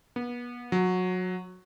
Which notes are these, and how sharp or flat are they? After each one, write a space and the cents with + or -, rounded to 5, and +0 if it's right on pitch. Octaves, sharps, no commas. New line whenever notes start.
B3 -30
F#3 -20